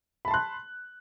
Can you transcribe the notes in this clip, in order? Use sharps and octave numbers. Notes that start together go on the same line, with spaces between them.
A5 B5 C6 F#6